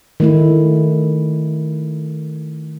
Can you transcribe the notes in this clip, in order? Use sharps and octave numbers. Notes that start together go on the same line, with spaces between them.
D#3 A3 E4